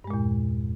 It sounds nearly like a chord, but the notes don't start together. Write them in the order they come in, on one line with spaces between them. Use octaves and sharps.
G2 G#3 A#2 E2